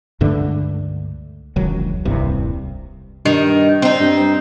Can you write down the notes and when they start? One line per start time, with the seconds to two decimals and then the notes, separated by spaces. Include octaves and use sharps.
0.21 C#2 G2 D3 A3
1.56 E1 C#2 D#3 F#3
2.05 D#1 C2 G2 C3
3.26 G2 D#3
3.82 C4 D#4
4.00 G2